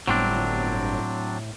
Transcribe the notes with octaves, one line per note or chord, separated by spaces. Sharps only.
G1 A2 F#3 C4 D4